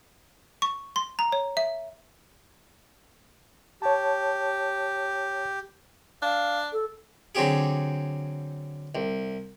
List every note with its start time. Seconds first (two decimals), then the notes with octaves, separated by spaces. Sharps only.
0.62 C#6
0.96 C6
1.19 A#5
1.32 C#5
1.57 E5
3.82 G4 C#5 A5
6.22 D4 F5
6.73 A4
7.35 D3 F#3 C4 G4 G#4
8.95 C2